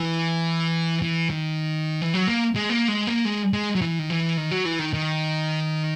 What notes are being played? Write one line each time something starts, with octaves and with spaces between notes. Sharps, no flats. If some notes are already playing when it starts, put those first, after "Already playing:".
Already playing: E3
E3
D#3
E3
F#3
A#3
G#3
A#3
G#3
A#3
G#3
G#3
F#3
E3
D#3
E3
D#3
F#3
E3
D#3
D#3